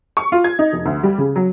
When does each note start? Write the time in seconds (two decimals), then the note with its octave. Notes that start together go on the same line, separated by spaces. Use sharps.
0.17 C#6
0.32 F4
0.44 G#6
0.59 D#4
0.73 F1
0.85 D2
1.03 G3
1.18 C#3
1.36 F#3